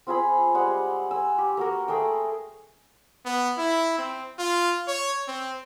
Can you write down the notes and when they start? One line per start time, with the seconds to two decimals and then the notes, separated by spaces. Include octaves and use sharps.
0.07 C4 F4 G#4 B5
0.54 G3 G#3 F#5
1.11 G#5 E6
1.38 G4
1.57 A#3 F#4 A#4
1.88 A3 G#4 A#4 G5
3.25 B3
3.58 E4
3.98 C4
4.38 F4
4.88 C#5
5.28 C4